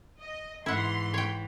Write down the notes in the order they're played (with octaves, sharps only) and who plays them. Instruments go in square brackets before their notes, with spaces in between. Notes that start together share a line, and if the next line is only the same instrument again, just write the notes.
[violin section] D#5
[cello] G#2 E3 [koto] E4 F#5 [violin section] C6
[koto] C#5 G5